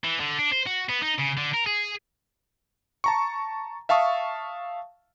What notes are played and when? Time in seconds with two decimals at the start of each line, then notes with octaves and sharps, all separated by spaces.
0.04 E3
0.20 D3
0.39 D4
0.52 C5
0.67 F#4
0.89 B3
1.02 D#4
1.18 C#3
1.37 D3
1.54 A#4
1.67 G#4
3.04 A5 A#5 C#6
3.89 E5 F5 A5 C#6 D#6